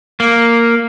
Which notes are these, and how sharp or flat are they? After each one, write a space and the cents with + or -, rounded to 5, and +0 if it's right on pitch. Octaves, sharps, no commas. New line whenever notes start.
A#3 -5